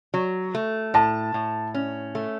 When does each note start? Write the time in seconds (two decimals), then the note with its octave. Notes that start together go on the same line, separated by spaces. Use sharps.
0.14 F#3
0.55 A3
0.94 A2 A5
1.34 A2
1.74 C#4
2.15 A3